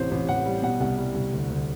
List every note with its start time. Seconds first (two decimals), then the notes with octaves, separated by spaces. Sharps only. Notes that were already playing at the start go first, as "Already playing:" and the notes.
Already playing: A1 C3 C5
0.11 A1
0.29 A1 F#5
0.46 G3
0.62 B2 F#5
0.80 C2 F#5
0.98 G3
1.15 C2
1.32 D2
1.50 D2